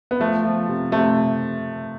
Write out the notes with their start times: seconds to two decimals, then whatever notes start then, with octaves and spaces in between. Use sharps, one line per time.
0.11 B3
0.20 F3 A3
0.45 F3
0.68 C3
0.92 C3 A3